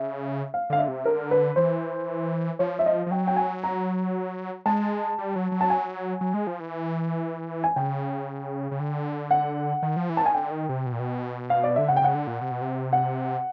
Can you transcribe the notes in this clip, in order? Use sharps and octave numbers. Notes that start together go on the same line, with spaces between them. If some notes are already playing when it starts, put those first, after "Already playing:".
Already playing: C#3 E5
F5
D3 F5
E5
C3
D3 A#4
B4
E3 C5
F3 C#5
E5
D#5
F3
F#3 G5
G5
G#5
A#5
G#3 A5
G3
F#3
F#3
A5
G#5
F#3
G#3
F3
E3
G#5
C#3 G5
C#3
D3
F#5
D#3
F3
E3
A5
D#3 G#5
D3 G5
D#3
C3
B2
A#2
B2
F5
D5
D3 E5
C#3 F#5
G5
C#3 F#5
D3
A#2
C3
B2
C3
F#5